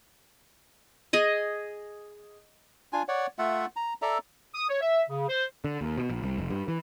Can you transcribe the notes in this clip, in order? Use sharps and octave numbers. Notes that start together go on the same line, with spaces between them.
G#4 D#5 G#5
D4 F4 G#5
C#5 D5 F#5
A3 F4 E5 F#5
A#5
A4 D5 E5 A#5
D#6
C#5
E5
C#3
C5
D3
D#2
B2
A#1
C2
F1
G2
E3